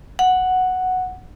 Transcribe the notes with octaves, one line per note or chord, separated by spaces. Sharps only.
F#5